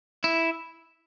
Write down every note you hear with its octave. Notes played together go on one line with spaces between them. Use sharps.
E4